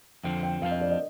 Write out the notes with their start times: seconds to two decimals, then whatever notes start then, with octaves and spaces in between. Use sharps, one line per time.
0.23 F2 D3 F3 C4 G5
0.43 G5
0.62 F2 D3 F3 C4 F5
0.71 D#5
0.81 D5
0.91 D#5